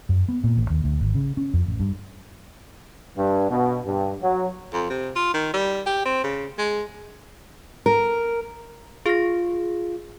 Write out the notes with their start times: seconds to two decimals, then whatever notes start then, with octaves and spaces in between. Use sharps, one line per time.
0.09 F#2
0.29 B3
0.44 A#2
0.57 A1
0.70 D#2
0.84 D2
1.01 G#1
1.15 C#3
1.37 C#4
1.54 F2
1.66 A1
1.80 G2
3.18 G2
3.50 B2
3.86 G2
4.22 F#3
4.73 F2
4.90 C3
5.16 F4
5.34 D#3
5.53 G3
5.86 G4
6.05 C4
6.24 C#3
6.58 G#3
7.86 A#4
9.06 F4 G#4 A#6